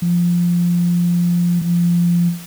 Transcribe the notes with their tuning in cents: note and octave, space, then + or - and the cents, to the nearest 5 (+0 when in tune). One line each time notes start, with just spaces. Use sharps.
F3 -5
F3 -15